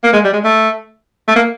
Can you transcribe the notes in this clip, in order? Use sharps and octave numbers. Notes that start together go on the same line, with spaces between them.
A#3
G#3
G3
G#3
A3
A3
A#3